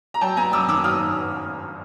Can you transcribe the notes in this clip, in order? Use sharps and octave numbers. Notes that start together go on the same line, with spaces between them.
A#5
F#3 G5 A5
B3 G#5 A#5
F#2 D6 E6
D#3 D6 E6
F#3 D#6 F6